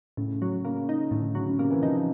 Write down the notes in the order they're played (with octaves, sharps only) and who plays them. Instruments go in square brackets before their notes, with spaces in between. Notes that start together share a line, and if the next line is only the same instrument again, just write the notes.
[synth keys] A2 [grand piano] C#3
[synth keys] F#3
[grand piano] C#3 [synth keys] A#3
[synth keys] D#4
[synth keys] A2 [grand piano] D3
[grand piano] C#3 [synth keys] F#3
[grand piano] C#3
[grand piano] C3 [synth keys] A#3
[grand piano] E3
[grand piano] F3 [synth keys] D#4